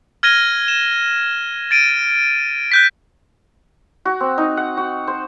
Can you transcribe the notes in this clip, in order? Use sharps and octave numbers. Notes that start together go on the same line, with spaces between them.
F6 G#6 A#6 D#7 G7
E7
A6 D7 D#7
F#6 G6 B6
F#4
C4
D#4
F#5
F#4
C5